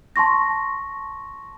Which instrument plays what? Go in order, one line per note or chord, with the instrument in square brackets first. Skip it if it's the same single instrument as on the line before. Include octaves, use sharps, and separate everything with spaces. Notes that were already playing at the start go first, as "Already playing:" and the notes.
[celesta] A5 C6 C#6 A#6